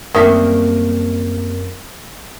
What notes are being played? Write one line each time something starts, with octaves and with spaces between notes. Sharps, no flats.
F#2 D#3 G3 A3 A#3 C4 A#4 E5